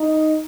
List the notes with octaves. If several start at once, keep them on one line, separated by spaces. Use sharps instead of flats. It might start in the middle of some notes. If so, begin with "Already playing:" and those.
Already playing: D#4